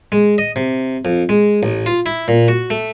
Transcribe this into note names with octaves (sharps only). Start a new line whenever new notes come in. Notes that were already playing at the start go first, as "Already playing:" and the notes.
G#3
D#5
C3
F2
G#3
A1
F4
E4
A#2
F#4
A3